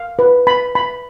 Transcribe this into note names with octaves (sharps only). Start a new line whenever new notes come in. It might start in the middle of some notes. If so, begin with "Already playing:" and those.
Already playing: F5
B4
B5
B5